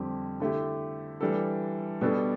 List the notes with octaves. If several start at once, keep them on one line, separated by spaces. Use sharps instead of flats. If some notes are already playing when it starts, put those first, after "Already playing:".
Already playing: F2 D3 G3 C4 G4
D3 A3 E4 G4
E3 G3 D4 A4
B2 G3 B3 D4 A4